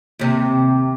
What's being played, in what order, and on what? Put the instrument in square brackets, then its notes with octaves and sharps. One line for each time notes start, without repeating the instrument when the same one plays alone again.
[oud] D#2 C3